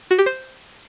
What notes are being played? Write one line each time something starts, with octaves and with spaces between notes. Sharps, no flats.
F#4
G4
C5